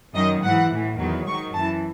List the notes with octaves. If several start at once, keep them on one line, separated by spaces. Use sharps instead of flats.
F#2 D#3 F#3 D#5
G#2 E3 F#5
A2 E3
E2 D#3 F#3
G#2 D#3 F#3 C#6
F#2 E3 A5